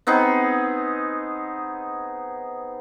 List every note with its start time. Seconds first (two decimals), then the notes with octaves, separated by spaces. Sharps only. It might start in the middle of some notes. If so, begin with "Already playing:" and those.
0.07 B3 C4 D#4 G#4